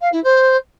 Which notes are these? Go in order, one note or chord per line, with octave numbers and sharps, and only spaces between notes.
F5
E4
C5